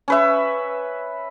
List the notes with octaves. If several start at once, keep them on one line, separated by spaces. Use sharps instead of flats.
C#4 B4 E5